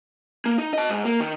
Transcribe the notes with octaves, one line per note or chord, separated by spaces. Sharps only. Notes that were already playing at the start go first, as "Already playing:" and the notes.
A#3
D#4
D#5 A5
G#2
A#3
D#3